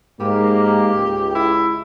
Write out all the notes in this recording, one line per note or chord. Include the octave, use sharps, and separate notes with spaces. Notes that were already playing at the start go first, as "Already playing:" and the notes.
G#2 A#3 G4
C#2
E4